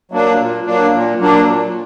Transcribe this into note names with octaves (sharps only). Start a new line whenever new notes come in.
F#3 A#3 D4
A#2
F#3 A#3 D4
A#2
F#3 A#3 D4
A#2